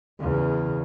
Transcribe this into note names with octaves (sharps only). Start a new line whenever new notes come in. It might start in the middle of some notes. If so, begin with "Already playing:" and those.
E2 C#3